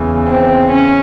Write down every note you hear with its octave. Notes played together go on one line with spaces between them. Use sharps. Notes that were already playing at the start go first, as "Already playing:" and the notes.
Already playing: E2 C#3 E3
C4
C#4